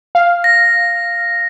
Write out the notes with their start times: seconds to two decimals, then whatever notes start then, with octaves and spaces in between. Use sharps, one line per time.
0.15 F5
0.44 A#6